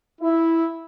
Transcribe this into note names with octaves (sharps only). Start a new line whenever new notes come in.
E4